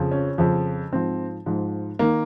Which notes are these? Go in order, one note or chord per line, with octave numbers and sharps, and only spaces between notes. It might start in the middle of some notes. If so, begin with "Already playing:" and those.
Already playing: F2 C#3 F3
C#4
F2 C#3 F3
G#2 F3 C4
G#2 F3
D#3 A#3